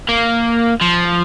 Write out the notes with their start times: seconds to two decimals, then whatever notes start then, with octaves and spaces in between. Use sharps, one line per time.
0.09 A#3
0.81 F3